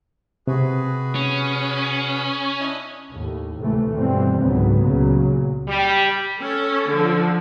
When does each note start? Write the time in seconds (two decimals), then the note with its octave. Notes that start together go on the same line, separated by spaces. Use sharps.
0.47 C3 F#4 G#4 B4
1.15 C#4
2.60 D4 E4 D#5
3.10 D#2 A2
3.60 D2 A2 C3 E3 A3
3.94 G2 B2 E3 G3 C4
4.41 C#2 G#2 D3 F#3 B3
4.82 C#2 A#2 C#3 F#3
5.68 G3
6.39 C#4 A4
6.91 D3 F3